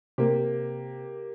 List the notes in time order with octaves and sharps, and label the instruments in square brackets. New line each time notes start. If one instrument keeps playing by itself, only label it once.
[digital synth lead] C3 [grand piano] A#3 G4